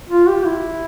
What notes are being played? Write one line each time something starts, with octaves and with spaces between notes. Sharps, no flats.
F4
G4
E4